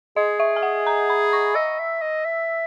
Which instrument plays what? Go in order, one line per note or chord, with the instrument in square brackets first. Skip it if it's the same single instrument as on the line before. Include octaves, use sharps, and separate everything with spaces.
[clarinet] G#4 [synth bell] D#5
[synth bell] E5
G#5
F#5
A#5
B5
C#6
[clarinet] D#5 [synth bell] E6
[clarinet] E5
D#5
E5